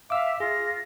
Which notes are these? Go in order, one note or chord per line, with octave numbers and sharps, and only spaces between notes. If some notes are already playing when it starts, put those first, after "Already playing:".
E5 F5 D6 E6
F4 G#4 A#6